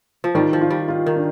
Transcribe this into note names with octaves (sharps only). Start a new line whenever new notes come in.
F3
D#3 G3
F3
F4
G3
F4
D#3
D4